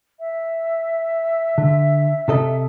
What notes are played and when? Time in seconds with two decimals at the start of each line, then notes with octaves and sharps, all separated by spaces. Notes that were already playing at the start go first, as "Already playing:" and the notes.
0.20 E5
1.58 D3
2.28 C3 A4 D#5